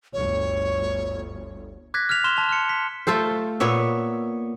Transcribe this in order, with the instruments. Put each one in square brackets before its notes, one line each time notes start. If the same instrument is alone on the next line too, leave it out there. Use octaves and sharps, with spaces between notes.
[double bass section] G1 D2 [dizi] C#5
[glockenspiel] D6 F#6 G#6 A#6 B6
F6 G#6 B6 F7
C6 F6 E7 G7
A5 F7
F6 C#7
B6
[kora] A3 F4 A4 C5
A#2 B3 C#5 E5